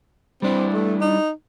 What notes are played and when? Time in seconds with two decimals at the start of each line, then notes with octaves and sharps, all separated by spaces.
0.42 G3 C4 D4 E4
0.73 A3
1.01 D#4